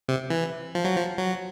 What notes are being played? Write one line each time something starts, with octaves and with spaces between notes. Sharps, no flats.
C3
E3
F3
F#3
F3
F#3